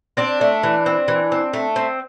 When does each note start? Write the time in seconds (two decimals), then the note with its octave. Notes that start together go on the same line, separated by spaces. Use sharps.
0.17 C4 D4 D5
0.41 A3
0.63 E3
0.86 C4
1.08 E3
1.32 C4
1.53 A3
1.76 C4